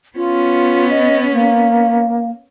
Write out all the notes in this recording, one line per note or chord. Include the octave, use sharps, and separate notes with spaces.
B3 C#4 F4
D#5
A#3